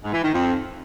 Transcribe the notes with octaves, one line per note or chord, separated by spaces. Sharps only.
G#2
E3
D#3
F2